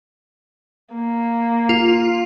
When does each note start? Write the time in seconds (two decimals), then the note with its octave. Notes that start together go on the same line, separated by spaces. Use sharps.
0.94 A#3
1.69 F4